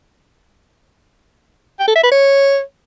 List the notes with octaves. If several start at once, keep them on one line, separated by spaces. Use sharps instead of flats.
G5
A4
E5
B4
C#5